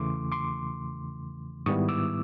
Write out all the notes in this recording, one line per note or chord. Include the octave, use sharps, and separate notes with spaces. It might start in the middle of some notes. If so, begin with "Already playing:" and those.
Already playing: E2 C#3 E3 A3 C6 D6
C6 D6
G#2 D#3 G3 B3 E4 C#6 D#6
D6 E6